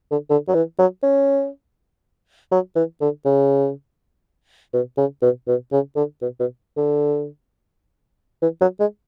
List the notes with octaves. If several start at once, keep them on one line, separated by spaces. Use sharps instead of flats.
D3
D3
F#3
E3
F#3
C#4
F#3
E3
D3
C#3
B2
C#3
B2
B2
C#3
D3
B2
B2
D3
E3
F#3
G#3